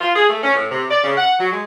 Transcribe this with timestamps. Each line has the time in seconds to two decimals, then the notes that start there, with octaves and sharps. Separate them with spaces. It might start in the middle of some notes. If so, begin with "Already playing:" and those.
0.01 F4
0.16 G#4
0.30 A3
0.44 C#4
0.55 A2
0.71 C3
0.90 D5
1.04 C#3
1.18 F#5
1.39 F#3
1.52 G#3